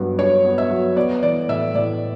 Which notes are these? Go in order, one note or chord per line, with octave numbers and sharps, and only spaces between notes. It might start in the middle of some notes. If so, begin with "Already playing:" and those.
Already playing: G2 F#3 B3
G2 C#5
B3
E5
F#3
B3 D5
E3 D5
A2 E5
A2 D5